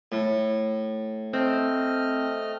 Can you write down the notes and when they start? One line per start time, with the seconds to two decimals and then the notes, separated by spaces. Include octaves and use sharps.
0.12 A2
1.33 A3 C4 D#5 F6